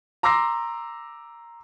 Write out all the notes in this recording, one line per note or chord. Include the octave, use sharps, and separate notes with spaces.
A#5 C6 D6 E6 A#6 C7